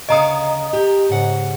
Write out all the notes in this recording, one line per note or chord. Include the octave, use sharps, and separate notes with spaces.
D2 C#3 D#5 F5 A#5 D#6
G4
G#2 C#3 F#5